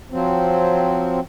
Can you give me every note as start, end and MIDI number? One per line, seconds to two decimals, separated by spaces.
0.11 1.20 53
0.11 1.20 54
0.11 1.20 60